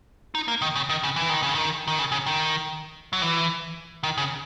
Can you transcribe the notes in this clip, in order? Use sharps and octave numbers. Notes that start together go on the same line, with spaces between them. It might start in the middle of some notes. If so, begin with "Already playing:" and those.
D#4
A#3
D#3
C#3
D#3
C#3
E3
D#3
C#3
D#3
D#3
C#3
C#3
D#3
F#3
E3
D#3
C#3